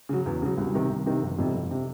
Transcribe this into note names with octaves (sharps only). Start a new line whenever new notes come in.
C#3 F#3
E2
C#3 F#3
C2
C3 D#3
C2
C3 D#3
F#1
F2 C3
F#1
C3